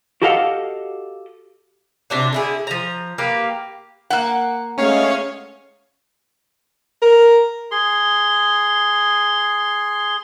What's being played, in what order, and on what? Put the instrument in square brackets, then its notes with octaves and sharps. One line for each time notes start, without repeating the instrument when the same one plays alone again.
[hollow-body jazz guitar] F#4 G4 A4 D#5 F5 F#5
[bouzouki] C3 D4 F#4
D3 E4 G#4
F3 A#5
A#3 G4 B4
[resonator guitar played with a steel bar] A#3 F#5
[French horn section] G#3 A3 [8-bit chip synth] C#4 C#5 F5
[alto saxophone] A#4
[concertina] G#4 C6